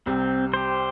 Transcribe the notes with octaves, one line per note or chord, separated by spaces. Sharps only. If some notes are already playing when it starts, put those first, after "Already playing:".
C2 C3 C4
G4 C5